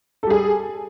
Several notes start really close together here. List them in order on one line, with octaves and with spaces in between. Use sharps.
A4 G3 G#4